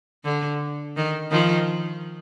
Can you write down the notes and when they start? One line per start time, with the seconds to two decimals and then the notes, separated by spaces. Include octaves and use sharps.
0.24 D3
0.97 D#3
1.31 D#3 F3